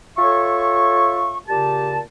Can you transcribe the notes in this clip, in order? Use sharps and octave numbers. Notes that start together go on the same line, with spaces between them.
F4 A4 C#5 E5 C#6
A#2 C#3 G4 A5